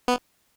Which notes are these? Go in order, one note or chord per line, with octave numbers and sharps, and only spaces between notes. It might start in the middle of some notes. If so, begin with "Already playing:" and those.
B3